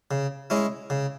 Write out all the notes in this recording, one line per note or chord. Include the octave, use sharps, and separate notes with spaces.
C#3
G#3 C#4 E4
C#3